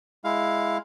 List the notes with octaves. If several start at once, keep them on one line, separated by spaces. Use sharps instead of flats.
G#3 E4 F5